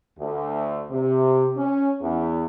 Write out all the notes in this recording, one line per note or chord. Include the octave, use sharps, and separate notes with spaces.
D2
C3
C#4
E2